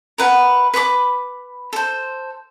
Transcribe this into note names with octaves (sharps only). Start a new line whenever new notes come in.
A#4 B4 F#5
B4 B5 C#6 D6
A4 C5